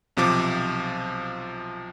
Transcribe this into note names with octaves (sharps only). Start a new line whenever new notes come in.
B1 C3 F3 D6